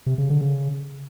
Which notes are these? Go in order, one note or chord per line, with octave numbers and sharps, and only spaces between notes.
C3
C#3
D3
C#3